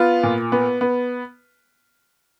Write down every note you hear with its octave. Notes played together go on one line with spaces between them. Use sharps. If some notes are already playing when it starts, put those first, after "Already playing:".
Already playing: B3 F4
A#2
B3
B3